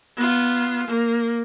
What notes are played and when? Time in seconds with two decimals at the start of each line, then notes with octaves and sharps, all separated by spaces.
0.17 B3 F4
0.87 A#3